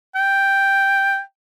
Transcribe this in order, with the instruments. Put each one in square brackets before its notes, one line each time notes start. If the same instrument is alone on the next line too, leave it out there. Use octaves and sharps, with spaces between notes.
[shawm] G5